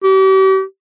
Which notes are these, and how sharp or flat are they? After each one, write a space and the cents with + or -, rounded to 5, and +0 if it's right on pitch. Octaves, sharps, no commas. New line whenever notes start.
G4 -40